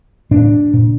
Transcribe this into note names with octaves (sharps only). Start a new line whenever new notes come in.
A2 D4
A#2